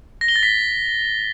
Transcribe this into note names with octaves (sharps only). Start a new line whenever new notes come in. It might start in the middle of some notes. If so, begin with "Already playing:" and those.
A#6
G7
A6
B6